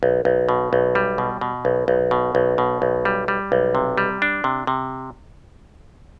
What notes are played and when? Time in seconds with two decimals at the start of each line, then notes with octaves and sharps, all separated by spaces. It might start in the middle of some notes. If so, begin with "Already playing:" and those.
0.03 B1
0.25 B1
0.49 B2
0.73 B1
0.95 G3
1.18 B2
1.41 B2
1.65 B1
1.88 B1
2.11 B2
2.35 B1
2.58 B2
2.82 B1
3.05 G3
3.28 G3
3.52 B1
3.75 C3
3.98 G3
4.22 D4
4.44 C3
4.67 C3